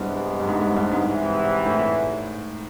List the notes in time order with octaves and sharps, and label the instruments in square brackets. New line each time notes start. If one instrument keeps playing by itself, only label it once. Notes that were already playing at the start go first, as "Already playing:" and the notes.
Already playing: [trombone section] C2 C3 E3 G#3 B3 [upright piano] G2
[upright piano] G2
G#2
G#2
G2
G#2
[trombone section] E2 C3 E3
[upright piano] A2